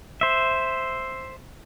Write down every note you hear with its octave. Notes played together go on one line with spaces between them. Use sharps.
C5 E5